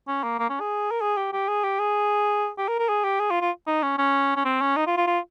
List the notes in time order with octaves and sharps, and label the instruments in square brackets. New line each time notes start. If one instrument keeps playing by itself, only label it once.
[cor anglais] C#4
A#3
A#3
C#4
G#4
A#4
G#4
G4
G4
G#4
G4
G#4
G4
A#4
A#4
G#4
G4
G#4
F4
F4
D#4
C#4
C#4
C#4
C4
C#4
D#4
F4
F4
F4